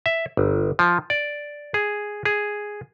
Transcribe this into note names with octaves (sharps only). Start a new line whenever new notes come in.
E5
G1
F3
D5
G#4
G#4